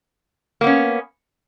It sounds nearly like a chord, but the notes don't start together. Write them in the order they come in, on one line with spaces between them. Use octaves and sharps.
A#3 B3 C#4